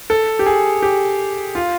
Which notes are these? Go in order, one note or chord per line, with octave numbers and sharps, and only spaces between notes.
A4
G4
G#4
G4
F4